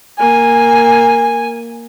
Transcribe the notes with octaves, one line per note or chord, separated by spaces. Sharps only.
A#3 G#5